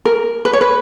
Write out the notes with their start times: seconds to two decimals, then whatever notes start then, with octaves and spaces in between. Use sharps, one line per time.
0.05 A#4
0.45 B4
0.53 C#5
0.61 B4